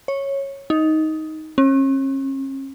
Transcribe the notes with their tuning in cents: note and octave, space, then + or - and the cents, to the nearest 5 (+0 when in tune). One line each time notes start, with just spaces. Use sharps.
C#5 -10
D#4 +10
C#4 -40